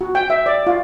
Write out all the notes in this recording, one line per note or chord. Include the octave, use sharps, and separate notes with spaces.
F#4
G5
E5
D5
F4